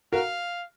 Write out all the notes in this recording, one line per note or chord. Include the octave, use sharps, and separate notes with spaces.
F#4 A#4 F5